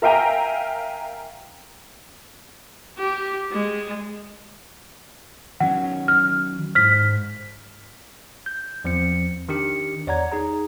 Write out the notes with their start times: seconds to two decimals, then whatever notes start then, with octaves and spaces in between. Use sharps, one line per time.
0.02 A#4 E5 F5 G5 G#5 A#5
2.98 G4
3.52 G#3
5.60 D#3 F#3 C#4 F#5
6.08 F6
6.75 G#2 C5 F6 B6
8.46 G6
8.84 E2 F3 C4 C#7
9.49 D#3 D4 G4 C#7
10.07 E2 C#5 D5 F#5 A#5 G#6
10.32 D#4 G#4 A#5